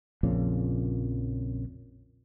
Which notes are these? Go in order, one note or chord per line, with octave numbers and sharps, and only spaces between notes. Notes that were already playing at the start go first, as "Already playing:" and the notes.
A#1 F2 A#2 C#3